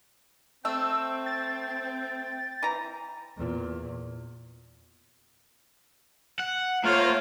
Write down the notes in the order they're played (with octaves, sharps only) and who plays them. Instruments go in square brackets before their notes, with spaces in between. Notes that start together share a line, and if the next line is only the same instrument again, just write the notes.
[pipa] A3 [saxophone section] C4 [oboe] G5 [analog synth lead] E6
[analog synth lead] A6
[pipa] E3 A#5
[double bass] E2 A#2
[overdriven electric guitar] F#5
[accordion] A3 C5 C#5 [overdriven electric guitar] A#3 F5 [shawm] F4